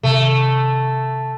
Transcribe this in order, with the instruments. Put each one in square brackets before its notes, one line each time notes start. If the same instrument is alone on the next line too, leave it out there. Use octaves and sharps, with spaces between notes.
[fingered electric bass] C3 D#3 [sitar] A3